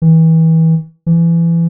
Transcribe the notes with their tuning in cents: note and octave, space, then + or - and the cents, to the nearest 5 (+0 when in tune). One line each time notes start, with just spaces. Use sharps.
E3 -30
E3 +25